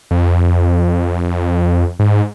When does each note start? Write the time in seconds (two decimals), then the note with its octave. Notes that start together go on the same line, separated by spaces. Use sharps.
0.11 F2
1.99 G#2